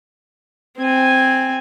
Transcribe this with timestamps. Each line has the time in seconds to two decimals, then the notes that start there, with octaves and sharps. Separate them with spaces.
0.78 C4 G#5